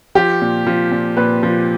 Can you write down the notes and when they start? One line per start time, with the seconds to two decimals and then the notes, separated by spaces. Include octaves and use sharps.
0.15 F3 G4
0.41 A#2
0.67 F3
0.92 A#2
1.17 A#2 B4
1.43 F3